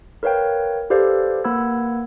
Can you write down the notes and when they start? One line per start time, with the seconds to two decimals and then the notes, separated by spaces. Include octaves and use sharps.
0.23 A#4 B4 C#5 F5 G5
0.90 G4 A4 B4 C5 D5 F5
1.44 A#3 B4 F#5 B5 E6 G#6